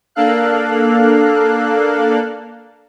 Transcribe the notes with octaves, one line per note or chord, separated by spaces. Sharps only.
A#3 D4 A4 F5 F#6